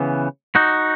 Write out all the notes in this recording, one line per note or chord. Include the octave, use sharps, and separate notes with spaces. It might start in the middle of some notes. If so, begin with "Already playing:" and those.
Already playing: C#3 E3 B3
D#4 F#4